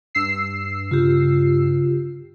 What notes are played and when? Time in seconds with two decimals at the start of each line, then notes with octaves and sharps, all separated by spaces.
0.15 G2 E6 C7
0.91 C#3 F4 G4